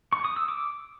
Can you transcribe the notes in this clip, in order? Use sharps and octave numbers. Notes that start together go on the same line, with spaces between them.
C#6
D#6
E6
D6